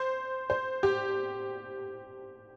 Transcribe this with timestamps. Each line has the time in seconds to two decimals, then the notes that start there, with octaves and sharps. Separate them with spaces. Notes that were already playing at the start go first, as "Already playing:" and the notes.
Already playing: C5
0.50 C5
0.83 G4